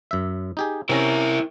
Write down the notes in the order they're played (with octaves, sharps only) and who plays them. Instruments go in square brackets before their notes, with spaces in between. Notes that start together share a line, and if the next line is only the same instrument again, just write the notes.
[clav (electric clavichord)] F#2 E5
D#4 G4 G#4
[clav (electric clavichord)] C3 C#4 A#5 [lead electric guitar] E4 A#4